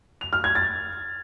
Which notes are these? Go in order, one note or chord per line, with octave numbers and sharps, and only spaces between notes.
F7
F6
G#6
A6